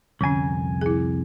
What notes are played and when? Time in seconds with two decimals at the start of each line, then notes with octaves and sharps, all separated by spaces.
0.21 C2 F2 D3 C#4 G#5
0.81 E4 G#4